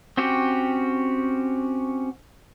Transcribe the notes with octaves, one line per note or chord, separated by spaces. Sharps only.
C4 C#4 F#4 G4